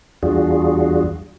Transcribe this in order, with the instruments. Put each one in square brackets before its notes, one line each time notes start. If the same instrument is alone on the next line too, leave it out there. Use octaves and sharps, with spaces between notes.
[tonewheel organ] E2 G3 D4 F4 F#4 G#4